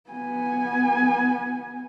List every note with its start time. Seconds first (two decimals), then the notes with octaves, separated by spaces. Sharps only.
0.10 B3 G#5